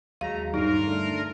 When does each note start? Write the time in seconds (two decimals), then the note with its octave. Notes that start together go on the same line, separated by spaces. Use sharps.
0.21 D#2 F#3 G#3 A3 F5 A#5
0.54 G2 G3 D#4 F4 A#4
0.87 D3 A3 D4